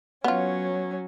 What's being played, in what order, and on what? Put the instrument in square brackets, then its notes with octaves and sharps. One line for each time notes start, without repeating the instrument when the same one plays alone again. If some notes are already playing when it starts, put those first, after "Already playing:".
[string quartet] F#3 C#4 [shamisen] B3 F4